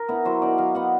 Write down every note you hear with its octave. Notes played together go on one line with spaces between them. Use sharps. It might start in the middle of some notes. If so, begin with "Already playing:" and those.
Already playing: A#4
B3 E4
F#3 C5
B3 D#4 D5
F#3 F5
B3 D#4 F#5